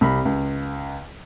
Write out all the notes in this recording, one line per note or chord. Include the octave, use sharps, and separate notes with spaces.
C2 B5
C#2